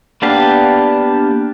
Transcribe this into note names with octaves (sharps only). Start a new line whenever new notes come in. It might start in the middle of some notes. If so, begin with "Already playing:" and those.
A#3 B3 D4 G4 F5